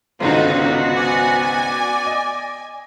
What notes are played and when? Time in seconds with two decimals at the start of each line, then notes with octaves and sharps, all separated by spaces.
0.20 G#1 C#2 D3 B3 D#4 F4 F#4
0.97 D5 G#5
2.06 D#5